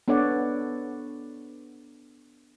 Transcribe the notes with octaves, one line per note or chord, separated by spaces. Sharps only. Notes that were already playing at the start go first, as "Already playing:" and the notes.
B3 D4 A4 C#5 D5 F#5